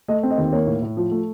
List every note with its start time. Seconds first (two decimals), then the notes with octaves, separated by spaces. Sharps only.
0.08 A3 D#5
0.23 C4
0.31 D#5
0.38 D#2
0.52 A#3 C#5
0.67 A2
0.82 A2
0.97 F3
1.11 A3